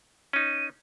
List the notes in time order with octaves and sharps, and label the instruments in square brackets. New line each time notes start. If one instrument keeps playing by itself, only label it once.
[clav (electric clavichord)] C#4 D#4 [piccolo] D#7